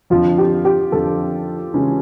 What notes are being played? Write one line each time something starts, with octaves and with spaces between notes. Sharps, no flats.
F2 D3 F3 F4
G4
G4
F2 D3 F3 A4
C#3 E3 G#3 C#4